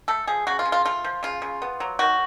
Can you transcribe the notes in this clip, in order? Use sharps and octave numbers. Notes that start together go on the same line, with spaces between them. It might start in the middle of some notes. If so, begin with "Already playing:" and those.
A3 A4
F3 G#4
C#3 F#4
F4
C#3
F4
A3 F4
F3
C#3 F4
C#3
B3
F#3
D#3 F#4